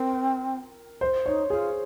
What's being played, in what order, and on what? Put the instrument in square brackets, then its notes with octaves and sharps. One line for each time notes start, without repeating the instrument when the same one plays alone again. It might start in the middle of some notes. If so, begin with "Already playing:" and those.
Already playing: [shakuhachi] C4 [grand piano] A#4
[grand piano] C5
[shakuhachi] D#4 [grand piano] C#5
[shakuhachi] F4 [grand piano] G#4